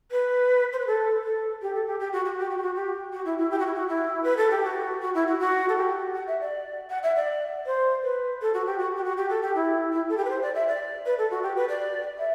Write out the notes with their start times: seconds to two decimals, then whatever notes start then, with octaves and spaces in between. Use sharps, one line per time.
0.11 B4
0.73 C5
0.79 B4
0.87 A4
1.24 A4
1.62 G4
1.75 A4
1.87 G4
2.00 G4
2.12 F#4
2.25 F#4
2.38 G4
2.50 F#4
2.58 G4
2.62 F#4
2.75 G4
3.13 F#4
3.25 E4
3.38 E4
3.51 G4
3.59 F#4
3.66 E4
3.74 F#4
3.88 E4
4.23 B4
4.37 A4
4.51 G4
4.64 F#4
5.01 F#4
5.15 E4
5.27 F#4
5.39 F#4
5.69 A4
5.77 G4
6.15 F#5
6.27 E5
6.40 D5
6.90 F#5
7.03 E5
7.16 D5
7.66 C5
8.03 B4
8.42 A4
8.54 F#4
8.66 G4
8.79 F#4
8.96 G4
9.04 F#4
9.17 G4
9.30 A4
9.42 G4
9.55 E4
9.93 E4
10.09 A4
10.17 G4
10.25 B4
10.30 C5
10.42 D5
10.55 E5
10.67 D5
11.06 B4
11.18 A4
11.31 F#4
11.43 G4
11.56 B4
11.69 D5
12.18 E5